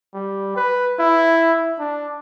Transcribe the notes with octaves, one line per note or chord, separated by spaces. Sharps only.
G3
B4
E4
D4